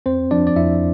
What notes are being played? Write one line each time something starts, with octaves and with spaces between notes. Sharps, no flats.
F2 C4 C5
F3 D4 D5
D5
F2 E4 E5